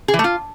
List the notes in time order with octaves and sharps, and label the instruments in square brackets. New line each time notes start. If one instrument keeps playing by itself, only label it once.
[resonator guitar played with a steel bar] G#4
E3
A3
F4